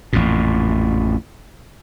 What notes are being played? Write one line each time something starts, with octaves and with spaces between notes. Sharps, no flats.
A1 F2 A#2